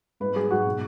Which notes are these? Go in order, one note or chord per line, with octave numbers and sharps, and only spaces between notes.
G#2 B4
F#3 G#4
G#2 F#4
B2